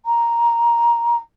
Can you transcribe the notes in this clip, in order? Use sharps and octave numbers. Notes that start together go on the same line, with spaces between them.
A#5